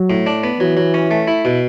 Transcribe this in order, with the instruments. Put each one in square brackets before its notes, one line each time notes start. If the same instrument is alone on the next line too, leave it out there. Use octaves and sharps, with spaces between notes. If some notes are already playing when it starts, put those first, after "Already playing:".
Already playing: [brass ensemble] F#3
[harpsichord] A2
D4
B3
[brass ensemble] E3 [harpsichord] F#3
[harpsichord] F#3
C#4
A3
E4
B2